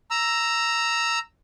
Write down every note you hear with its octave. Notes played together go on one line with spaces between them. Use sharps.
A#5 E6